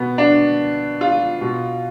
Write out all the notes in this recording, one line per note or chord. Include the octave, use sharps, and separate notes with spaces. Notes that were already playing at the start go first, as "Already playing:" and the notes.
Already playing: B2 B3
D4
F4
B2